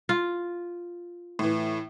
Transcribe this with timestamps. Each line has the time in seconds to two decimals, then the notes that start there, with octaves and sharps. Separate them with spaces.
0.09 F4
1.39 A2 E3